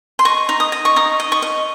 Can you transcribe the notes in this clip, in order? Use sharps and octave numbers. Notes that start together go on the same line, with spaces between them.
C6
D#5 C#6
D#4
D#6
D#5
C#6
D#4 D#6
D#5
C#6
D#5